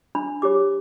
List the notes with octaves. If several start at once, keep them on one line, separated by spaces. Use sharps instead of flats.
D4 B5
G4 C#5 D6